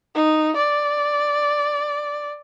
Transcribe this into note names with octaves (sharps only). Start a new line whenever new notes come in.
D#4
D5